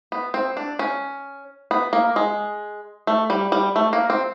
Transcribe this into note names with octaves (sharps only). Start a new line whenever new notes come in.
B3
C4
D4
C#4
B3
A#3
G#3
A3
G3
G3
A3
A#3
C4